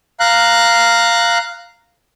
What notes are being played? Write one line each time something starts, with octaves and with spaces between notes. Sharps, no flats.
F5 A#5 F#6